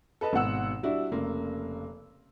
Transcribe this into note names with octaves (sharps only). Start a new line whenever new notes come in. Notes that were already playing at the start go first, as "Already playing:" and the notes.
A4 B4 D#5 A5
G#1 B2 F#5 E6
G3 D4 E4 F#4
F1 C#3 A#3